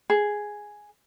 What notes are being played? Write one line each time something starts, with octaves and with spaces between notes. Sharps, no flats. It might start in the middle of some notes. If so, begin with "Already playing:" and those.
G#4